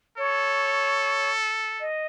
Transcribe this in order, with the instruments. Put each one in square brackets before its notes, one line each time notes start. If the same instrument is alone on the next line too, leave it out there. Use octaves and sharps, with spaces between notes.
[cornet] A4 [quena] C#5
[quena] D#5